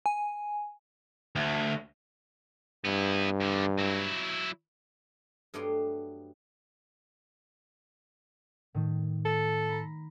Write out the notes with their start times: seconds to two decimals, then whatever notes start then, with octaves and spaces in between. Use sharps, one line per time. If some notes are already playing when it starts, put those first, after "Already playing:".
0.06 G#5
1.35 D2
2.85 G2 B3 E4
3.40 E2 D3
3.79 F#3 E4
5.54 G2 F#3 A3 B3 D5 C6
8.74 A2 D#3
9.25 A4
9.69 A#5 B5